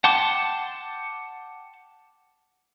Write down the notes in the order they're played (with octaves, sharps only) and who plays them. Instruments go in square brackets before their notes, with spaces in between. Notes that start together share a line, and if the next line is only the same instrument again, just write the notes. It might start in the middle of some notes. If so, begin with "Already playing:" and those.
[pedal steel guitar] F#5 G5 A5 C6 D6